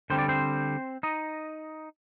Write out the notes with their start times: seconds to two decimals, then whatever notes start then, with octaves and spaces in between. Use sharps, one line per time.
0.10 D3 G3 C4 C5
0.19 D5
0.28 C4 C5
1.03 D#4 D#5